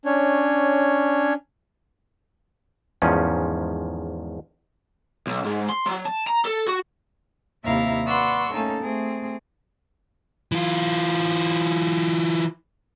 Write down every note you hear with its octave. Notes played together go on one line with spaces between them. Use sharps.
C#4 D4 C#5
E2 G#2 D#3 F3 C#4
B1
G#2
C6
F#3
A5
A#5
A4
F#4
D#2 C3 E4 E5 F5 A#5
B4 D5 F#5 C6 C#6 E6
A3 A#3 C#4 D#4 A4
A3 C4 G#4
E3 F4